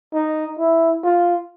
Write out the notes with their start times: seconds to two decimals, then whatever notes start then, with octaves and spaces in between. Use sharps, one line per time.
0.14 D#4
0.59 E4
1.04 F4